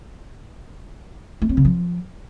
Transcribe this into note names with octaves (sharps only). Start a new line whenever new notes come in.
A3
C4
C#3
F3